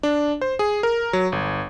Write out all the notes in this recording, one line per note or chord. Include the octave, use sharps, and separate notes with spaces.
D4
C5
G#4
A#4
F#3
G1